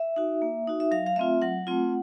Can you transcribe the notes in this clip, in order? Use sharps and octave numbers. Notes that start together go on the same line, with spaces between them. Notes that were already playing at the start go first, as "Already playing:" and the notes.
Already playing: E5
D#4 F#4
A#3
D#4 F#4
E5
F#3 F5
F5
A3 C4 F4 E5
F#3 F#5
A3 C4 F4